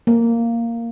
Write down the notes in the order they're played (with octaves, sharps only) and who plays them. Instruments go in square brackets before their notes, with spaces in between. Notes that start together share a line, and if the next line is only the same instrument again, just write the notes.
[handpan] A#3